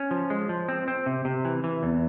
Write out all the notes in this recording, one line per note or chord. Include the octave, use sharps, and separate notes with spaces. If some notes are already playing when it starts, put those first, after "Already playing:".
Already playing: C#4
F3
G#3
F3
C4
C4
C3
C3
E3
E3
E2